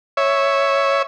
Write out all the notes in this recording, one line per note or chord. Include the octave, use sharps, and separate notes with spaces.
C#5 E5